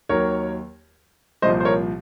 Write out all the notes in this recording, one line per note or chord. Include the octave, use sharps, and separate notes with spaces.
D#2 D#3 F#3 A#4 C#5
C2 A#2 F3 C5 D#5
C5
A#4 C#5